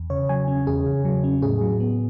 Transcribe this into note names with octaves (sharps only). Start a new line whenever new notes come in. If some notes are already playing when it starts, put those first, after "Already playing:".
Already playing: E2
C#3 C#5
F#3 G#5
C#4
E2 G#4
C#3
F#3
C#4
A2 G#4
F#3
B3